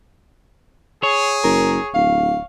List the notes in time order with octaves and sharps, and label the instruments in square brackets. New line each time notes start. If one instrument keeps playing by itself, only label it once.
[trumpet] G#4 [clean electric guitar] C#5
[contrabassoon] F#1 [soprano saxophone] A#4
[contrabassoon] D1 [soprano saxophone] F5